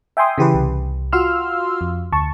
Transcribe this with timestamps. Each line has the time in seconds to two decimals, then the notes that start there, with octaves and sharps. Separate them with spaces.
0.17 E5 G5 G#5 C6 D#6
0.38 C#3 E3 G4 B4
0.54 C2
1.13 F4 F#4 F5 C6 E6 F6
1.81 F2
2.12 D2 A5 C#6